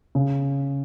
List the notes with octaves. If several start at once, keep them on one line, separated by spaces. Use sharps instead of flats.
C#3